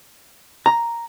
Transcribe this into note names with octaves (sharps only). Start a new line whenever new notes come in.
A#5